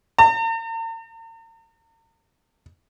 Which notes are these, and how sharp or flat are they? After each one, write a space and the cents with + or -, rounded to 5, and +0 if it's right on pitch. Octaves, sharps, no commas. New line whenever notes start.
A#5 -45